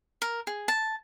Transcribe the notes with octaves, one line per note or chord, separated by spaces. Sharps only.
A#4
G#4
A5